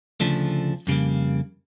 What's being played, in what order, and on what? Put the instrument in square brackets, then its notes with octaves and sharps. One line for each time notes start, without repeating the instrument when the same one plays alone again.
[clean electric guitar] D2 C#3 F3 A3 D4
F2 C#3 G3 A#3